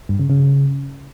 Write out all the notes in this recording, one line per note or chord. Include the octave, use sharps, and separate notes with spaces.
G2
C#3
C#3